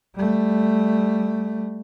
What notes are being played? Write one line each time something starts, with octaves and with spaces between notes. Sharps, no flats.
G3 A3